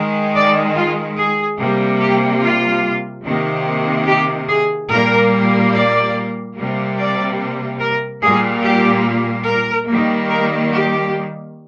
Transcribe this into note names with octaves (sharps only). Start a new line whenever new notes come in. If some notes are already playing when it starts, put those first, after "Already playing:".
Already playing: D#3 G#3
D5
F4
G#4
C3 G3 A#3
G4
F4
C3 D#3 A#3
G4
G#4
A#2 G3 A#3 A#4
D5
C3 G3 A#3
D5
A#4
A#2 G3 A#3 G#4
G4
A#4
D#3 G3 A#3
A#4
G4